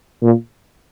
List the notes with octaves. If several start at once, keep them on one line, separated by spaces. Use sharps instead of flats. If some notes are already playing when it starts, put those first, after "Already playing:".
A#2